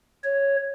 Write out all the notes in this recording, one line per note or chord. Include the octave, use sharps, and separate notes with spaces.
C#5